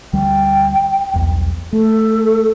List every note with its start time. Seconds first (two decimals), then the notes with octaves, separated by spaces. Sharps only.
0.13 D2 G3 G5
1.13 B1 E2 G2
1.73 A3 A4